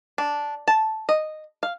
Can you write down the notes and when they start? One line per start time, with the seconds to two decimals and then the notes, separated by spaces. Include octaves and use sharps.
0.18 D4
0.68 A5
1.09 D#5
1.63 F5